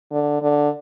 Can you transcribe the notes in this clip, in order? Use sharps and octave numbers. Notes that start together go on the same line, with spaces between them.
D3
D3